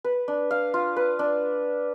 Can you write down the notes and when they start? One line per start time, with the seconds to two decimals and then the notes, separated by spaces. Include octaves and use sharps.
0.04 B4
0.28 D4
0.51 F5
0.74 F4
0.96 B4
1.19 D4